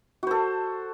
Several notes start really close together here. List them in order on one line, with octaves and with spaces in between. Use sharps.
F#4 C5 A4